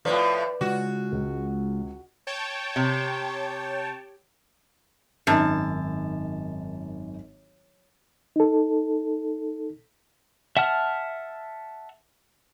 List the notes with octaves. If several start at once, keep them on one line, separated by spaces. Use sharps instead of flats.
A2 F3 B4 D5
C#3 G#3 F4 F#4
C#2
C#5 G5 A5
C3
G#1 F#2 D#3 A5
D#4 A4
E5 F#5 A5 F6